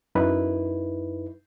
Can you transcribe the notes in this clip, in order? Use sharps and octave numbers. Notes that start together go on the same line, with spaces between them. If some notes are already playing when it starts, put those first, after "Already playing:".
F#2 D#4 E4 B4